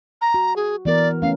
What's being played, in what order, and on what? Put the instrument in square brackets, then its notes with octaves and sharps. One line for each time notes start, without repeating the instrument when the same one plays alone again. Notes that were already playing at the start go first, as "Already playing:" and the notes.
[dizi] A#5
[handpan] F#4
[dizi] G#4
[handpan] E3 B3 A#4 [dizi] D5
[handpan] A3 C#4 [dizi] F5